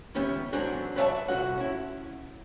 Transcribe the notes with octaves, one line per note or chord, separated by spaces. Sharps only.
C#2 D#3 B3 C#4 G4 E5
G#2 E3 F#3 C4 D4
B4 C#5 D5 E5 F5 A5
C2 F2 F3 F#4 F#5
C#4 E4